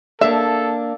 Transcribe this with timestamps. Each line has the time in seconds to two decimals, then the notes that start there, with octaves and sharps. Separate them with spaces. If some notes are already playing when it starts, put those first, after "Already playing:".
0.21 A#3 D4 A4 E5